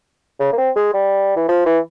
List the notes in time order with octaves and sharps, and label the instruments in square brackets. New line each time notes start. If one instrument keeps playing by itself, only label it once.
[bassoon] C#3
A#3
C4
G#3
G3
E3
F3
E3